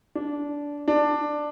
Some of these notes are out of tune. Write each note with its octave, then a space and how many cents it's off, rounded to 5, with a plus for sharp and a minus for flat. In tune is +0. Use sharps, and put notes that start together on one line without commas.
D4 -15
D4 +10